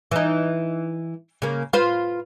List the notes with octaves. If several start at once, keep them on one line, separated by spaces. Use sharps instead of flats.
E3 D#4
C#3 A#3
F4 B4 C5